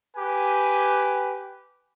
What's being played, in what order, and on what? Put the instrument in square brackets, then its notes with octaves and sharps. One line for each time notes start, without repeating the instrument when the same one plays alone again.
[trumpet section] G4 B4 G#5